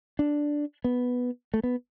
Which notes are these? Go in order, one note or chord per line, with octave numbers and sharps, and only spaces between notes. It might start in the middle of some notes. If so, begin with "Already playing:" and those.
D4
B3
A3
B3